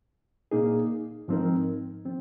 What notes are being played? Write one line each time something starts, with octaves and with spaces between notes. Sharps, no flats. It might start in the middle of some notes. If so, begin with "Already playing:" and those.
A#2 A#3 D#4 G#4
G#2 F3 C4 D#4 A#4
F3 C4